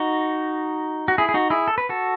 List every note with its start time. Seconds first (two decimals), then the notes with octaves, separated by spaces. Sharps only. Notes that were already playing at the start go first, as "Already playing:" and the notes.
Already playing: D#4 F#4
1.08 F#4
1.18 E4 G#4
1.29 G#4
1.34 D#4 F#4
1.50 E4 G#4
1.68 A4
1.78 B4
1.89 F#4 A4